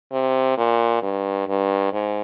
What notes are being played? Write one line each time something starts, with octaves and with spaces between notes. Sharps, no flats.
C3
A#2
G2
G2
G#2